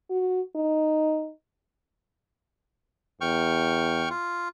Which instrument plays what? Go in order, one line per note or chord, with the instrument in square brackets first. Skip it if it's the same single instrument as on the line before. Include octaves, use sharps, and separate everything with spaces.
[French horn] F#4
D#4
[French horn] E2 [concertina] G5 C#6 F6
[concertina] F4